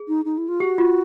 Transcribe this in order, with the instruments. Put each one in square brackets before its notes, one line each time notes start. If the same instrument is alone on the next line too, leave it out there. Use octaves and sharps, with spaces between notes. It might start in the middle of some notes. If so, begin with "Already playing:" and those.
Already playing: [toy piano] G#4
[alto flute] D#4
D#4
E4
F4
[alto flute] F#4 [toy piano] G4
[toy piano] F4